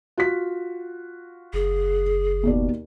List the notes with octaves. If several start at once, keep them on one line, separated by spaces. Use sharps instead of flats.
F4 F#4 B6
F#1 G#4
D#2 B2 D5